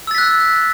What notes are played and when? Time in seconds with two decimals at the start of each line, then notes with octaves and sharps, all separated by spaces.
0.07 E6
0.11 A6
0.15 B6
0.18 F#6